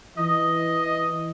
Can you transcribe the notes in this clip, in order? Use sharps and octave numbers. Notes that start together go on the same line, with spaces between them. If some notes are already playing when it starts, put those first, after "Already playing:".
E3 D#5